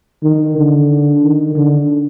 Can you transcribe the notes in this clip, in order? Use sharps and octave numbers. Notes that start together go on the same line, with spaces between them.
D#3
D3
D#3
D3